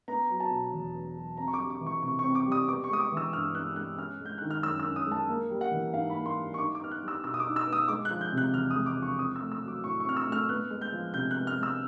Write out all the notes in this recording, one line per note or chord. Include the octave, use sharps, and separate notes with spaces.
B3 A#5
F#3
A5
B2
E2
B3
F#3
C4 A#5
C#6
D6
G3
D6
E3
C#6
C3 C#6
C#6
C4
D6
G3
D#6
B3 D6
C#6
G#3 D#6
D6
E3
E6
G2 F6
B3 F#6
G#3 F#6
C#4 F6
G#3
G6
D#3 F#6
F6
F#2 E6
E6
C#4
D#6
G#3 A5
A#3
G3
F#5
E3
G#2 F5
B5
A#3
C6
G3
C#6
D#4 D6
D6
B3 F6
F#6
G3
E6
B2 E6
D#6
D6
D#4
E6
B3
D#6
G#3 D6
F#6
F3
G6
C3
F#6
E2 F6
D#6
G#3
D6
F3
C#6
C4 D#6
E6
A3
E6
F#3
D6
A2 C#6
C#6
C4 F6
E6
A3
F6
B3 F#6
G#3
G6
F3
C3 G6
F#6
B3
F6
G#3
E6